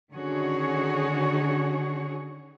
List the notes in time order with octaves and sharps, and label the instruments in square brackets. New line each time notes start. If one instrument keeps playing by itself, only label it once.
[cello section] D3 D#3 C#4 F#4 G#4 C#5